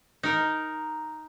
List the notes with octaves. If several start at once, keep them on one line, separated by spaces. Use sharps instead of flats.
D#4 A#4